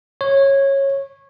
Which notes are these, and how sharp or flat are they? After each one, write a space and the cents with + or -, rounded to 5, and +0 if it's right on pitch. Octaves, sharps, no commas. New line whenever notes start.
C#5 -15